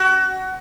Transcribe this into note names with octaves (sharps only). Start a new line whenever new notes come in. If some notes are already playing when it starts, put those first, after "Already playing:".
Already playing: F#4